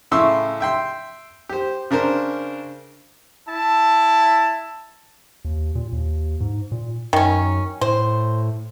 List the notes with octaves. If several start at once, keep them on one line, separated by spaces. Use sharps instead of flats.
A2 C#3 E4 C6 C#6 E6
E5 G5 C6
G4 C5
C#3 D4 A#4 C5
E4 A5
D#2
A#2
D#2
G#2
A#2
F#2 D#3 C#4
A2 C5